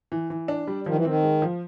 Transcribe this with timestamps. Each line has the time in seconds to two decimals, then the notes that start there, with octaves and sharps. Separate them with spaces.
0.12 E3
0.30 E3
0.48 D4
0.67 G3
0.86 D#3 F3
0.95 E3
1.05 D#3 C4
1.23 G#3
1.42 F3